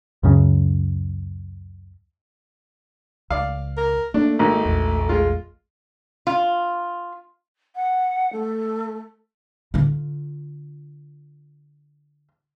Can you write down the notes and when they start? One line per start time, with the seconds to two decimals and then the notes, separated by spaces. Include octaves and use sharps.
0.23 C#2 F#2 C#3
3.30 C#2 D5 F5
3.77 A#4
4.14 A3 A#3 D4
4.39 G#1 D#4
4.65 A#1 E2
5.09 G#3 F4
6.27 F4
7.75 F#5
8.32 A3
9.74 D3 F4